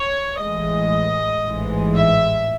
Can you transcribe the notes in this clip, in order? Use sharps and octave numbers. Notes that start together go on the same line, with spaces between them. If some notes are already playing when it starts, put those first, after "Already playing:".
Already playing: C#5
A1 A2 E3 G#3 D#5
A1 G#2 E3 G#3
E5